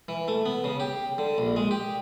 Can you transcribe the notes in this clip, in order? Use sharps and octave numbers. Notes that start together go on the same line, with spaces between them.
E3
A3
B3
C#3
G4
D3
A#1
G#3
G4